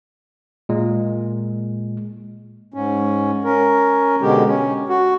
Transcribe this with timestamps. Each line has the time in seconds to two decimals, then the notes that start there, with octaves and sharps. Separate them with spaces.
0.69 A#2 G#3
2.74 G#2 C#4
3.44 C#4 A#4
4.22 B2 D3 G#3 G4
4.47 C#4
4.89 F#4